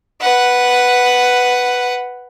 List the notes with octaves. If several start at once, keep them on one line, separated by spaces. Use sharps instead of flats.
B4 F#5